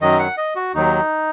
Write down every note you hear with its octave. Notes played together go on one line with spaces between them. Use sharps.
F#2 D#3 F#3 D#5
F#5
D#5
F#4
D#2 D#3 F#3 D#4